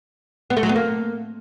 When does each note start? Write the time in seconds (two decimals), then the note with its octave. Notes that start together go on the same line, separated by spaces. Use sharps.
0.50 B3
0.57 A3
0.63 F#3
0.69 B3
0.76 A#3